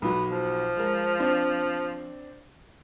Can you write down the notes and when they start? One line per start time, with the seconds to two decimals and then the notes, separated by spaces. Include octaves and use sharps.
0.02 B1 B2 B3
0.30 F3
0.77 G#3 A#4
1.20 C4 D4 C5